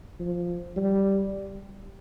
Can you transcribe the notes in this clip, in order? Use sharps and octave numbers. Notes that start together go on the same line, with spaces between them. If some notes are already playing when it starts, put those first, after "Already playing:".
F3
G3